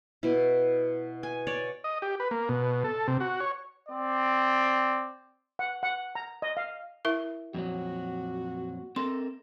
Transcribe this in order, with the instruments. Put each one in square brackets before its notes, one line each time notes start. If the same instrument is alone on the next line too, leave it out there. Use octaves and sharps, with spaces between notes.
[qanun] B2 E4
G#5
C#5 D5
[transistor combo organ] D#5
G4
B4
A#3
B2
A4
C3
F#4
C#5
[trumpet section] C4 D5
[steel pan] F#5
F#5
A#5
D#5
F5
[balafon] E4 A#4 E5
[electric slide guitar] F2 A#2 F#3 [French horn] F#4
[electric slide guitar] C4 A4 A#4 [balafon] C6